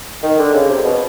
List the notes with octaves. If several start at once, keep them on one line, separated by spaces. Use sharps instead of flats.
D#3
D3
C#3
C3
B2